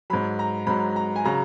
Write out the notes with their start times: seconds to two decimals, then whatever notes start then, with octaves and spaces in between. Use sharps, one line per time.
0.10 G#2 F#3 B5
0.39 A#5
0.67 G#2 F#3 B5
0.96 A#5
1.16 G#5
1.24 C#3 F#3 A#5